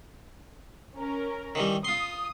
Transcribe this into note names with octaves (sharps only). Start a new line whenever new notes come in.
C#4 A#4
D#3 E3 G3
F4 C6 D#6